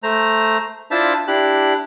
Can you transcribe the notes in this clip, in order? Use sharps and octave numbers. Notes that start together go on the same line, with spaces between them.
A3 C5 A#5
D4 E4 F4 C5 E5 A5
D4 E4 G4 F#6